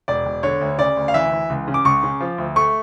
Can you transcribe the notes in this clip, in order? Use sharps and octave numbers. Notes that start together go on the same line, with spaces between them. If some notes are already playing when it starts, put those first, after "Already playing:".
E1 D5
E1
D3 C#5
D2
C#3 D5
D2
F5
E3 E5
E3
C#2
C#3
D6
C#2 C#6
C#3
F3
D2
A3 C#6